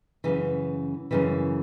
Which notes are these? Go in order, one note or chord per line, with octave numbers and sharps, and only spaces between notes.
F#2 C#3 E3
F#2 C#3 E3